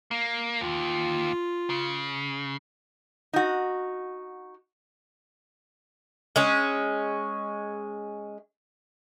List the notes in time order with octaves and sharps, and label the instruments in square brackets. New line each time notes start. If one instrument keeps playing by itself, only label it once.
[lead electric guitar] A#3
[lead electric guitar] D#2 [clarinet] F4
[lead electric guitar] C#3
[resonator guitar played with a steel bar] D#4 F#4
[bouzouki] G#3 C#4